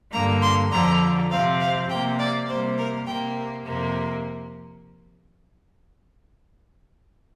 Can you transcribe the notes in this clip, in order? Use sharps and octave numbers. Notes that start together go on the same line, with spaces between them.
G2 D3 A#3 A#5
C6
F2 D3 F3 A#5
C3 F3 C4 F5
F5
C3 A#3 G5
D5
C3 G3 A#3 C5
A#4
C3 A#3 G5
F2 C3 A#3